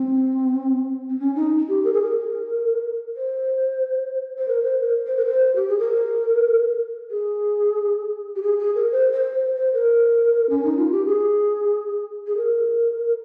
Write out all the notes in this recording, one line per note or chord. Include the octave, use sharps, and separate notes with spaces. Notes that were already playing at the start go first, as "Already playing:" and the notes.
Already playing: C4
C4
C#4
D#4
G4
A#4
G#4
A#4
C5
C5
A#4
C5
A#4
C5
A#4
C5
G4
G#4
A#4
G#4
G4
G#4
G#4
A#4
C5
C5
C5
C5
A#4
C#4
D#4
F4
G4
G#4
G#4
A#4